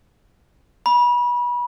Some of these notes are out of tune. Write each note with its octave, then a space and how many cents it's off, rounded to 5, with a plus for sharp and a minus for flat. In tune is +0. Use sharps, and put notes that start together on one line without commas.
B5 -30